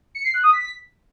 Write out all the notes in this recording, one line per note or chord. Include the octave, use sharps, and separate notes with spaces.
C#7
C7
F#6
D#6
B6